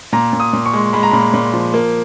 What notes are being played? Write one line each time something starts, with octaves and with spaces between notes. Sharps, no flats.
A#2 A#5
A#2
D#6
A#2
C#6
G#3
G#3 B5
A#5
A#2 B5
A#2
F3
A#3